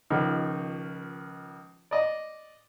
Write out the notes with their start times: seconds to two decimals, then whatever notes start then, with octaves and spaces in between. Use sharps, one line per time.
0.10 C#2 D#3 F3
1.91 D5 D#5